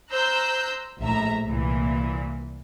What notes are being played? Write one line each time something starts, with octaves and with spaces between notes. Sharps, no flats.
C5 A#5 E6 F#6 G6
A#1 A2 E5 A#5
C2 A#2 E3